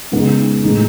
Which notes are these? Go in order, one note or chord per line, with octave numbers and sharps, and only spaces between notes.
C#3 G#3 B3 D#4 G#4
A2 G#3 D#4 G#4